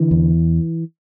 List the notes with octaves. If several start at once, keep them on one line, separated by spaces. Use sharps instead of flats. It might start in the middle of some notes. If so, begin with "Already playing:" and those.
Already playing: D3 E3
E2